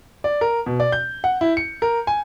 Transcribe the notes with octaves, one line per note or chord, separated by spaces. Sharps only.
D5
A#4
B2
D5
G6
F#5
E4
C#7
A#4
G#5